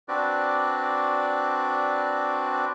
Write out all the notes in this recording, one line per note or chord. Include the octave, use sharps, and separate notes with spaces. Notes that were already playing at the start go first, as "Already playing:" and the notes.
C4 D4 F#4 B4 D5